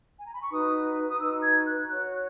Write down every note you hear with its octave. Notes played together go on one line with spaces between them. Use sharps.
G#5
A#5
B5
C#6
D#4 F#4 B4 D#6
D#6
D#4 F#4 B4 E6
G#6
F#6
F#4 C#5 F#6